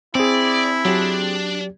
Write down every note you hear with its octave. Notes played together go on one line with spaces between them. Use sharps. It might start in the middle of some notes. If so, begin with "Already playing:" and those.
C4 E4 G#4 D5
F#3 D4 G4